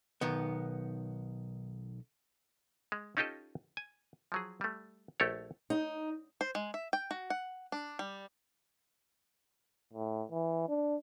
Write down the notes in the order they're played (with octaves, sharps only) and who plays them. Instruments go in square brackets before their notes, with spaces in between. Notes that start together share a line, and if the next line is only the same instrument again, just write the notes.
[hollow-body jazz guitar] B1 D#3 B3
[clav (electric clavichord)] G#3
C#4 D#4 F4 G4 A4 D#5
G#5
F3 F#3 G#4
G3 A3
A#1 A3 G4 A4 C#5
[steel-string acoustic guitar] D#4
[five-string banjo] C5
G#3
E5
G5
F#4
F#5
D4
G3
[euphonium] A2
E3
D4